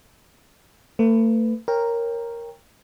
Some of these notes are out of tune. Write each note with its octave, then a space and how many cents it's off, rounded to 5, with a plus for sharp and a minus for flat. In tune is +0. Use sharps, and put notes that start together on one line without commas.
A3 +40 B4 +20
A#4 +0 C#5 -15 G5 +20